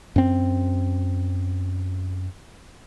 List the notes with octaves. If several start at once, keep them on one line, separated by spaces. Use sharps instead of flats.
F#2 C4